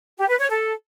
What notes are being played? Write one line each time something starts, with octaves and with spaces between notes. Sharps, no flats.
G4
B4
C#5
A4